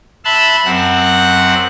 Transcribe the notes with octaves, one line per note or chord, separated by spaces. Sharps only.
E5 A5 B5 C6 E6 F#6
F#2 C4 F#5 F#6